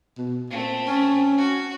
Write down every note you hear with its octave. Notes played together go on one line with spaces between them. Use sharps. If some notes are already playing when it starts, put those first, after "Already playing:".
B2
A#2 A3 C4
C#4
F#4